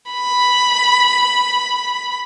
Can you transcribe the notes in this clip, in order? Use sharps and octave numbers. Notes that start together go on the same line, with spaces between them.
B5